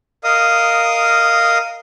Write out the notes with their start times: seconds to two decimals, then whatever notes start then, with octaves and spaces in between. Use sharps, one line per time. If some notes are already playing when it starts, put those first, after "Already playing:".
0.24 A#4 D#5 F5 D#6